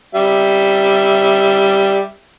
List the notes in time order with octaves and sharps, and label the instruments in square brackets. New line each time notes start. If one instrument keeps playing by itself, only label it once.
[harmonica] G3 E5